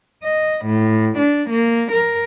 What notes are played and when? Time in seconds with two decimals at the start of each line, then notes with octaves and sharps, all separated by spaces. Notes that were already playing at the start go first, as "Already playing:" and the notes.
0.23 D#5
0.66 A2
1.18 D4
1.50 A#3
1.91 A#4